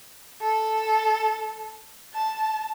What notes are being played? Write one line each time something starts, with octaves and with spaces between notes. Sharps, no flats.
A4
A5